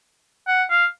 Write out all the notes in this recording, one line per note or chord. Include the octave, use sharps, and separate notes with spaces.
F#5
F5